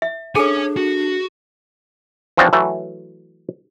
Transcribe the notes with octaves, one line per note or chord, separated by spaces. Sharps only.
E5
D4 G#4 A4 C#5 G#5
F#4
E3 F3 C4 D4 F#4 C#5
E3 F#3 A3